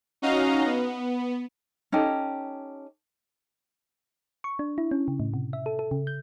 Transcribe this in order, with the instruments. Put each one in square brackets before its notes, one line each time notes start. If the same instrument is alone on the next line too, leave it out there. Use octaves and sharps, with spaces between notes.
[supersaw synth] C#4 D#4 F#4 D#5 F5 A#5
B3
[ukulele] C#4 D#4 G4 A4
[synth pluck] C#6
D4
E4
C#4
C#3
A2
C3
E5
A4
A4
C#3
G6